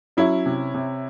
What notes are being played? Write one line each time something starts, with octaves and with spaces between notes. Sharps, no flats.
F#3 C#4 E4
C3
C3